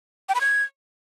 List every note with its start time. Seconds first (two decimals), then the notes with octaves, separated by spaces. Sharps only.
0.29 G5
0.35 B5
0.41 G#6